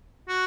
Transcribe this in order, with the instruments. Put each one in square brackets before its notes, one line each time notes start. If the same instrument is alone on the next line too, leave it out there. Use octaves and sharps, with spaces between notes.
[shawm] F#4